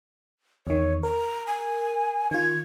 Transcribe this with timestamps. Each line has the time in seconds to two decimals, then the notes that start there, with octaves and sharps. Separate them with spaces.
0.67 E2 D#3 C#5
1.03 A#4 A#5
1.47 G#5
2.31 D#3 F4 G#6